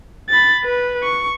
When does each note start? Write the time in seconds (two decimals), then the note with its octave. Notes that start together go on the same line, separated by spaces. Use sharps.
0.29 B5 A6
0.64 B4
1.03 C#6